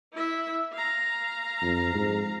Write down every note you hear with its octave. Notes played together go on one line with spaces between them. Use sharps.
E4 E5
F5 A#5
F2
G#2